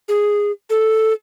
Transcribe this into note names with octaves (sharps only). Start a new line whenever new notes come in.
G#4
A4